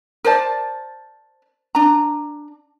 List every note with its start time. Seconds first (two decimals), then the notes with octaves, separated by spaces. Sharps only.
0.25 A#4 C5 D5 A5
1.75 D4 A#5